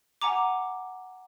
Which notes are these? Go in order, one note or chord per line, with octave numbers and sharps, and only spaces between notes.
F#5 G#5 A#5 D6